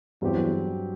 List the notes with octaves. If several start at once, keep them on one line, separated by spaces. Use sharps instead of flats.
E2 G2 F#3 C4 G4